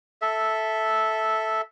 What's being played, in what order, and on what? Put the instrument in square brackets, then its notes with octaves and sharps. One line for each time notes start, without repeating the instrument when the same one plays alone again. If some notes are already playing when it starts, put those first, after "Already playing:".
[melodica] A4 E5